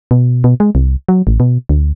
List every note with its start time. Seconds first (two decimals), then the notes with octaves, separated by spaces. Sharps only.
0.11 B2
0.44 B2
0.60 G#3
0.75 C2
1.09 F#3
1.27 A1
1.40 B2
1.69 D2